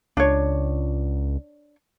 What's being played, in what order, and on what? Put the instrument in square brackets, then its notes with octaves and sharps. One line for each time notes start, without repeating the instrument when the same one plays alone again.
[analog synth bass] C#2 [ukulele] D4 C#5